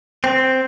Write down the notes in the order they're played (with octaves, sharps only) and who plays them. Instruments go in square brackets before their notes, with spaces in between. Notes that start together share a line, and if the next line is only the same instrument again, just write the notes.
[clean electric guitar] C4